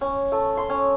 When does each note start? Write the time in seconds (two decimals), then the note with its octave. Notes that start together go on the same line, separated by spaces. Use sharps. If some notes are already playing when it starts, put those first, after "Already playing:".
0.01 C#4
0.32 A3
0.57 C6
0.70 C#4